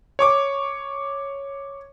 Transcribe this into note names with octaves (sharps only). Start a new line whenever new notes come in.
C#5 C#6 D6